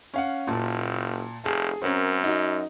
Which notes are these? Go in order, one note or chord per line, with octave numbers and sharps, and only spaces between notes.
C#4 F5 F#5
F#1 A#2 A5
F1 G#4 A5
F#2 C4 C#4 A#4
D#4 F#4